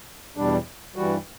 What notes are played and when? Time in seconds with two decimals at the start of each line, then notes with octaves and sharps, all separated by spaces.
0.36 E2 B2 G3 D4
0.96 G2 E3 G3 F#4